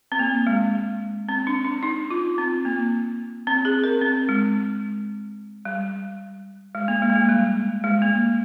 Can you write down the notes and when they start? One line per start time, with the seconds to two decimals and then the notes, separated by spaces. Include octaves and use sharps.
0.12 C4
0.19 A#3
0.47 G#3
1.29 C4
1.47 D4
1.65 D4
1.83 D#4
2.10 F4
2.38 C4
2.65 A#3
3.47 C4
3.65 G#4
3.84 A#4
4.02 C4
4.29 G#3
5.65 G3
6.75 G#3
6.88 A#3
7.02 G#3
7.10 A#3
7.16 G#3
7.29 G3
7.84 G#3
8.02 A#3